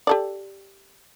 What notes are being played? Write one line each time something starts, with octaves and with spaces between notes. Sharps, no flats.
G4 A4 D5